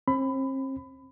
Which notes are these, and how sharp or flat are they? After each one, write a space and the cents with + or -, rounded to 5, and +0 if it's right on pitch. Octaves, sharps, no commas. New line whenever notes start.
C4 +40 B5 +25